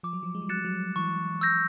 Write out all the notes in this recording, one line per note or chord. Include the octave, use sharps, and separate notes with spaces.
F3 D6
F#3
F3
G#3
G3
F#3 F#6 A6 C#7 E7
G3
F#3
E3 C#6
E6 G6 A#6